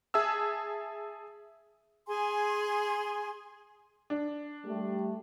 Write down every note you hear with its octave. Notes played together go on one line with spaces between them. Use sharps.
G#4 E5 A5 E6
G#4 G#5 C6
D4
G3 A3